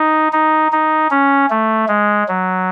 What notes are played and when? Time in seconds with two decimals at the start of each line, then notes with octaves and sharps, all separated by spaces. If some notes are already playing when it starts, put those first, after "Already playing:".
Already playing: D#4
0.33 D#4
0.72 D#4
1.11 C#4
1.50 A3
1.88 G#3
2.28 F#3